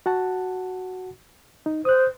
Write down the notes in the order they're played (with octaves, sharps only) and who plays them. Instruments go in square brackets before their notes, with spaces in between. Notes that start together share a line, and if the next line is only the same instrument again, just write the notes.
[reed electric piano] F#4 F#5 A5
D#4
[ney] C5 [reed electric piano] D#6 F#6